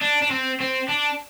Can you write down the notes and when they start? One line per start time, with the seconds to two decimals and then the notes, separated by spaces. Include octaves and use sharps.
0.02 D4
0.22 D4
0.31 C4
0.60 C4
0.89 D4